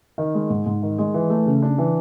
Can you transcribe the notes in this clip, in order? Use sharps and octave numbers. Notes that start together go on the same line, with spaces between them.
D#3
G#3
G#2
G#2
D#3
G#3
E3
A3
C#3
D4
E3